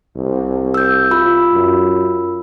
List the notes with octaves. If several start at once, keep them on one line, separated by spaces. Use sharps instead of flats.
C2
E6 G6
F4 B5 E6
F#2